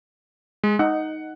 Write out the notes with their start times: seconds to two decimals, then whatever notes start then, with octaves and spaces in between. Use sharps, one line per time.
0.64 G#3
0.79 D#4 F#5